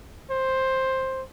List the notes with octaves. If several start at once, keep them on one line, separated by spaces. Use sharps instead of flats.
C5